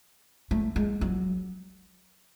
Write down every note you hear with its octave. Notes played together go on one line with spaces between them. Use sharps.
A3
G#3
F#3